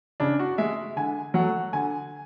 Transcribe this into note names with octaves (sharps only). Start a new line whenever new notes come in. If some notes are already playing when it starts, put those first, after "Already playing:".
C#3 D4
F#4
G#3 E5
D3 G#5
F#3 A3 F#5
D3 G#5